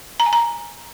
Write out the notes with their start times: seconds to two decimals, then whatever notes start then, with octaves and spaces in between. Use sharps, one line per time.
0.20 A#5
0.26 G#5
0.33 A#5